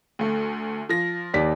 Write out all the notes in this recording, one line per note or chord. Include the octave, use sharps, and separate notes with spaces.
D2 A3
F3 A#6
D#2 D5 B6